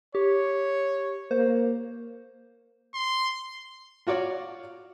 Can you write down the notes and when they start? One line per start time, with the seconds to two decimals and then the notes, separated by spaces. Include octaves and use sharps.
0.15 G4 C#5
1.31 A#3 C5
2.94 C6
4.07 F4 F#4 C#5 D5